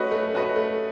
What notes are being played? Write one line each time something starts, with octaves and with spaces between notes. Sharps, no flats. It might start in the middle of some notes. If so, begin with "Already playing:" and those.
Already playing: A3 C#4 F#4 B4 D#5
A3
C#4 F#4 B4 D#5
A3